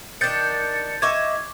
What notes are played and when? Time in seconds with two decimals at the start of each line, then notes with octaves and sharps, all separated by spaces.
0.21 D#3 D4 G6 A6 C#7
1.02 E4 D#5 E5 C#6 D6 G#6